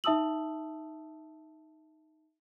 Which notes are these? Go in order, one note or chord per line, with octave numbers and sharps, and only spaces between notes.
D#4 E5 A5 D#6 E6 F#7